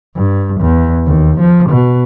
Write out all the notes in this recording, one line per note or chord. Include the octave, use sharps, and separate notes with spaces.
G2
E2
D#2
F3
B2